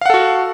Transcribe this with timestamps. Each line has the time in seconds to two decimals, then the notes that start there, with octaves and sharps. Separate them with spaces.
0.01 F5
0.06 F#5
0.10 A4
0.14 F#4